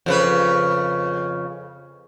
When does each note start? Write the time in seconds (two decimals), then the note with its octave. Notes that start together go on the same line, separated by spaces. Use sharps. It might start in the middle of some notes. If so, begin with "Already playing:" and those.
0.06 F2 C#3 B4